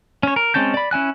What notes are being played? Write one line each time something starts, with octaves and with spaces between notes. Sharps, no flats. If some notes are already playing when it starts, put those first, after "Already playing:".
C#4 C#5
A#4
G#3 C4 C#4 A5 G6
D5 B5
C#4 E4 G#5 F#6